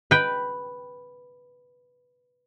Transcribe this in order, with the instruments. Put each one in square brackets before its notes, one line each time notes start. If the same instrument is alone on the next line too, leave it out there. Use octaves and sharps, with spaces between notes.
[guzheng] B4 G5